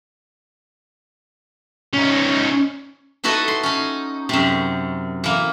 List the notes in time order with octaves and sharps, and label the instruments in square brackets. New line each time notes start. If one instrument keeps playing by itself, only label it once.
[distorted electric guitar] C#4 D#4
[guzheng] D#4 E4 F#4 A4 B4 D#5
C6
C#4 D#4
F#2 C3
E3 A#3